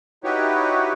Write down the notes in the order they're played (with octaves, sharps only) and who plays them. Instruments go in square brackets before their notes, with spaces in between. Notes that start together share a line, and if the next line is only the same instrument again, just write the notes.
[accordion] D#4 E4 F#4 G4 B4 C#5